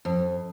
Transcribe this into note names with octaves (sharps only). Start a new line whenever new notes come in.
F2